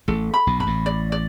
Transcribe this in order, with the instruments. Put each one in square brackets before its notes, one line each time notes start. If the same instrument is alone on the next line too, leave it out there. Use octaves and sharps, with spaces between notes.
[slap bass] A1 A2 [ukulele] A4
[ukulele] B5
[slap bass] B1 B2
[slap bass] G2 [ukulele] B5
[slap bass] A1 A2
[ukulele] D5
D5